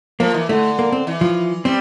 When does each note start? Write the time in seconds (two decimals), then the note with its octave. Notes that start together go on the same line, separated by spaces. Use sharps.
0.20 F3 A#3
0.34 E3
0.49 D3 A3
0.79 A#3
0.92 C4
1.07 E3
1.21 F3
1.65 G3 C4